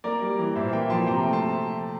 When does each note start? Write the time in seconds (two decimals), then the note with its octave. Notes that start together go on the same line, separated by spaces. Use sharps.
0.04 A#3 A#4 D5
0.22 G3
0.39 E3
0.56 A#2 C5 E5
0.73 A#3 E5 G5
0.90 F3 A5 C6
1.07 C3 G5 A#5
1.24 A3
1.33 A5 C6
1.42 F3